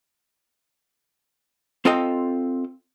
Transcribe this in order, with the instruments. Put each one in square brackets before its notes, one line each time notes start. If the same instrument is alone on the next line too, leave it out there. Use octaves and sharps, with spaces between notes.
[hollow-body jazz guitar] C4 F4 A4 D#5 G5